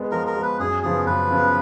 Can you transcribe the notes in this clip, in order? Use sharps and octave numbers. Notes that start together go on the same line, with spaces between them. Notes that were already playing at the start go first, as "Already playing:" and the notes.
Already playing: G#3 B3
F3 A#4
A#4
G#3 B3
B4
F#2 G#4
C#3 F3 B3 G#4
F#2 B4
C#3 F3 B3